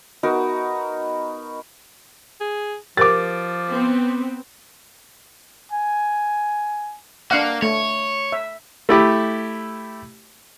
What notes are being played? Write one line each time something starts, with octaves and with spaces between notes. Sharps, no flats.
B3 D#4 F#4 A#4
G#4
F3 G4 A#4 C5 D6 A6
B3 C4
G#5
A#3 D4 F5 F#5
A3 C#5
E5
A3 E4 G4